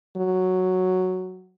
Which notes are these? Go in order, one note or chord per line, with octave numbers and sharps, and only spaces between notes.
F#3